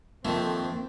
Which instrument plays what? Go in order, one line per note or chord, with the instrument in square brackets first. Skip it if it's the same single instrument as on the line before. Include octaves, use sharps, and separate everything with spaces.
[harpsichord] F2 D#3 A3 [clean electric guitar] F3 A#3 [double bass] C4